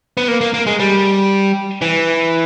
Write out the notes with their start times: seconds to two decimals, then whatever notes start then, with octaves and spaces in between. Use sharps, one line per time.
0.17 B3
0.28 A#3
0.41 A#3
0.54 A#3
0.67 G#3
0.79 G3
1.82 E3